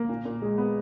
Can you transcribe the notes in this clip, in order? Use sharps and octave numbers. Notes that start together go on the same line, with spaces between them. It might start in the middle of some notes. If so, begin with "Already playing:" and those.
Already playing: A#3
A#2
A#2
G#3
B3